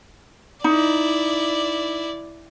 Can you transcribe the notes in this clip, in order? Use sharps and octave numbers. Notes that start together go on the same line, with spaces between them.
D#4 E4 D5